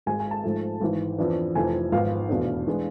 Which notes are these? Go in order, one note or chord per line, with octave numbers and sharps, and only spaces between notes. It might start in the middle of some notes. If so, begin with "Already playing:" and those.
G#1 G#2 G#3 G#5
G#5
A5
G#2 F3 A3
G#1 G#2 E3
F2 E3 B3 D4
F1 F2 E3 G#5
G#1 G#2 F3 B3 F5
F1 E2 B2 B3 D4
E3 G#3 B3 D4